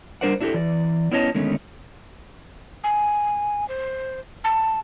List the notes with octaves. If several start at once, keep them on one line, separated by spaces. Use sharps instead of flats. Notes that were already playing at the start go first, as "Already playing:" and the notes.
G3 D4 A#4 C5 D5 F#5
D4 E4 F#4 G4 A4
E3 D5
B3 C#4 E4 C#5 D#5 A5
D3 D#3 G#3 A3 B3 C#4
G#5
C5
A5